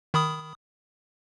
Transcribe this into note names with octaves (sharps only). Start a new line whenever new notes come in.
D#3 B5 D#6